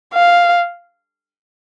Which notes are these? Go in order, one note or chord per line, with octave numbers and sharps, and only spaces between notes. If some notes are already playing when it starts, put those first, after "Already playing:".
F5